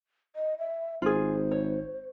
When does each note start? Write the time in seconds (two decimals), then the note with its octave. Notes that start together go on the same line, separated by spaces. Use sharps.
0.36 D#5
0.59 E5
1.02 G#1 F4 G#4 C5
1.51 C#5